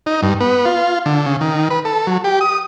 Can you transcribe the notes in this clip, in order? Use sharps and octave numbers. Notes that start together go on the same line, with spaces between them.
D#4
G2
B3
F4
D3
C#3
D#3
B4
A4
F#3
G4
D#6